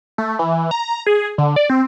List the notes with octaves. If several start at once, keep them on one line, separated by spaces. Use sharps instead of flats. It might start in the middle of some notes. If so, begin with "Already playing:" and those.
A3
E3
A#5
G#4
D3
D5
C4